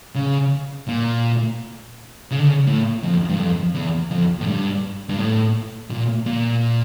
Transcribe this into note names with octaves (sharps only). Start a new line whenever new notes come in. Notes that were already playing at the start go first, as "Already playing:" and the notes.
C#3
A#2
C#3
D3
C#3
A2
F2
G2
F2
E2
F2
A2
G2
G2
A2
A#2
A#2